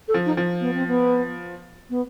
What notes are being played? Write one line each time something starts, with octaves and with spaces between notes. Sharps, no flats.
A4
F3
D#4
F3
B3
C4
B3
B3